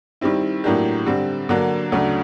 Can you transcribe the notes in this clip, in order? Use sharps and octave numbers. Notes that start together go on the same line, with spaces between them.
D#3 G3 C4 E4
A2 F#3 A#3 D4 G4
D3 G3 C4
D3 F#3 A#3 D4
D2 C#3 F#3 A3 D4